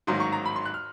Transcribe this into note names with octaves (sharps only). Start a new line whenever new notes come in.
A1 G#2 D#3 F#3 A#3 C6
C#6
A#5
B5
C6
F#6
F6